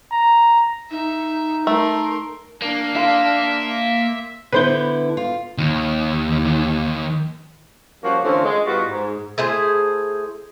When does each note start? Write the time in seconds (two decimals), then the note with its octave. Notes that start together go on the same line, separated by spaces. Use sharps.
0.12 A#5
0.91 D#4 E5
1.67 A3 A#4 C6
2.62 A#3 D4
2.96 E5 F5 C6
4.52 D3 B3 E4 B4 C5 G6
5.17 F4
5.58 D#2 D#3
8.02 F3 G3 A#3 C#4 F#4
8.23 D3 E3 F3 A3 C4 C#4
8.44 G#3
8.67 A2 G3 B3 F4 F#4
8.90 G#2
9.38 A3 E4 G#4 C5